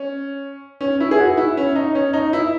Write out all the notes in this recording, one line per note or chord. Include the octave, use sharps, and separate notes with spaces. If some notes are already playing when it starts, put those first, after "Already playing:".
Already playing: C#4
C#4
E4
G#4
F#4
E4
C#4
D#4
C#4
D#4
E4